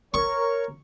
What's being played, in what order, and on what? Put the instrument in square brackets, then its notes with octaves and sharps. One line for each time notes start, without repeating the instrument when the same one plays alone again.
[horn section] A#4 C#5 [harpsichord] C#6